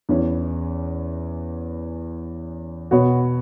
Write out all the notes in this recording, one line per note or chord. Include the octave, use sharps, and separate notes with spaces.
E2 E3 C#4
B2 B3 F#4 C#5